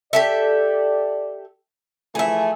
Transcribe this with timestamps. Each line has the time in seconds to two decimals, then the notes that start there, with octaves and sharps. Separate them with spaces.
0.13 G4 A4 D5 E5
2.15 E3 F3 A3 G#4 E5